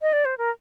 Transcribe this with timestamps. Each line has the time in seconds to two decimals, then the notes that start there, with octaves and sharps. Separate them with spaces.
0.00 D#5
0.13 D5
0.25 C5
0.38 A#4